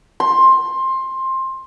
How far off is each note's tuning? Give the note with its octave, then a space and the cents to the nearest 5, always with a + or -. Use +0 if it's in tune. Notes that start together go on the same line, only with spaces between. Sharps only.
C6 +15